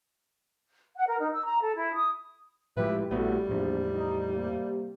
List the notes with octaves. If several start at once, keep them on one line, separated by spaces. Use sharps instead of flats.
F#5
A#4
D#4
E6
A#5
A4
E4
D#6
A2 E3 F3 G#3 E4 G4 B4
A#1 A2 C3 G3 A3 B3 F#4
A#1 E2 A2 F3
D#4
C3 A#3